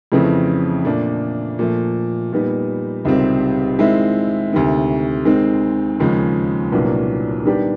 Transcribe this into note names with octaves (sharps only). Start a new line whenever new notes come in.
F2 C#3 E3 A3 C4
A#2 F3 A3 D4
A#2 F3 A3
A#2 G3 B3 D#4
C#2 C3 D#3 G3 C4
D#3 G#3 C4 E4
D2 C3 D#3
D#3 G#3 C4 D#4
D#2 C#3 F3 G#3
C2 A#2 F#3 B3 D4
D#3 G3 B3 D4 G4